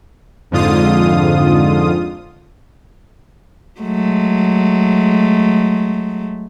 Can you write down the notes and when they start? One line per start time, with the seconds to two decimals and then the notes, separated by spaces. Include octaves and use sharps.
0.51 F2 G#2 D3 F4 D#6
3.81 F#3 G#3 A3